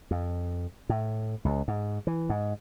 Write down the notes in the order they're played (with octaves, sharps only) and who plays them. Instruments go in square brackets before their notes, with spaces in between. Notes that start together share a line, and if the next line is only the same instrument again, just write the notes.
[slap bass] F2
A2
C#2
G#2
E3
G#2